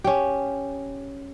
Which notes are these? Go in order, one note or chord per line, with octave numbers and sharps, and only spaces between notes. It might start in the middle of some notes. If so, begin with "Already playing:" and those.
C#4 G4